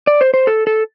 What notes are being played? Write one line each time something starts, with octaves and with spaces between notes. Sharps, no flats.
D5
C5
C5
A4
A4